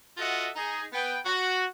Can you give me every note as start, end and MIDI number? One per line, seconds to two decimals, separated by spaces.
0.18 0.50 65
0.18 0.50 66
0.18 0.50 69
0.18 0.50 75
0.18 0.50 76
0.18 0.50 78
0.56 0.84 63
0.56 0.84 68
0.93 1.17 59
0.93 1.17 79
1.26 1.65 66